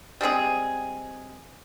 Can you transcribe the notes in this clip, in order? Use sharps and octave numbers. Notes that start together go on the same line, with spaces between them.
G3 G#3 C4 G#4